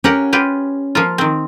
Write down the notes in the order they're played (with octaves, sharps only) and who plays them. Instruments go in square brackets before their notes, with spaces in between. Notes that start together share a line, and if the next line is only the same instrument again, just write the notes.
[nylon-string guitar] C#4 [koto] G4 A#4 F#5
[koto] F4 G4 B4
F3 A#3 F4
D#3 C4